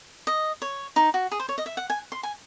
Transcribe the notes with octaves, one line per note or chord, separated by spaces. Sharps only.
D#5
C#5
D#4
F#4
G#4
C5
C#5
D#5
E5
F#5
G#5
C6
G#5